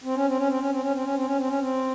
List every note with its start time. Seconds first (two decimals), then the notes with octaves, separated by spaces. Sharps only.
0.04 C4
0.15 C#4
0.26 C4
0.37 C#4
0.48 C4
0.59 C#4
0.70 C4
0.81 C#4
0.93 C4
1.04 C#4
1.15 C4
1.26 C#4
1.37 C4
1.48 C#4
1.59 C4